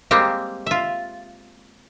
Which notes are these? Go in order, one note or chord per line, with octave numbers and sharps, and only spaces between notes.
G3 G#3 A#3 C4 G4
F4 E5